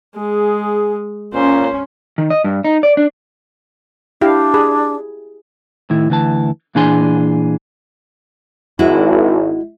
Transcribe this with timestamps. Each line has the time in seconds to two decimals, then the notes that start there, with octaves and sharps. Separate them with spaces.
0.16 G#3 G#4
1.34 A#2 C#4 C5
2.18 D#3
2.30 D#5
2.44 G2
2.64 D#4
2.83 D5
2.97 D4
4.21 D4 E4 G4 F5
4.54 G#4 B5
5.90 A2 D#3 E4
6.10 D2 E3 A5
6.75 A#2 E3 D4 G#4 G#5 C6
8.79 G#1 G#3 E4 F#4